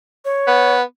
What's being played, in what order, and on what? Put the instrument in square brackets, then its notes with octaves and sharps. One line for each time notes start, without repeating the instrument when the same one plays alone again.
[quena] C#5
[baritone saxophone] B3